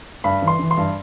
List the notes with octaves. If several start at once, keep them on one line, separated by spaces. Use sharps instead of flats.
G2 B5
E3
C6
E3
C6
G2